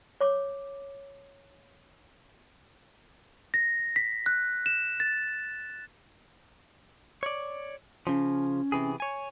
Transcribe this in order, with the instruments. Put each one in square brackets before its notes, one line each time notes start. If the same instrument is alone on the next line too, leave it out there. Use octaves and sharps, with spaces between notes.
[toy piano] C#5 D6
[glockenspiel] A#6
B6
F#6
E7
A6
[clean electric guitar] C#5 D5
[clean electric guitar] C#3 F3 [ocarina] C#4
[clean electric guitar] C3 E3 G#4
C#5 G#5